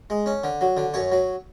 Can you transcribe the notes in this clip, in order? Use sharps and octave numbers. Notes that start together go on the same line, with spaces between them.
G#3
C#4
D3
F#3
D3
F#2 C#5
F#3